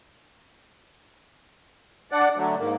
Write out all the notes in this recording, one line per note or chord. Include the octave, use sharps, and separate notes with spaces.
D4 D5 F#5
D3 F#3 A3
G#2 A#3